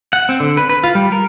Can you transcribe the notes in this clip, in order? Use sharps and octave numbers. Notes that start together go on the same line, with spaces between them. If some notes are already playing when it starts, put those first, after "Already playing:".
F#5
C4
D3
B4
B4
F4
G3
A#4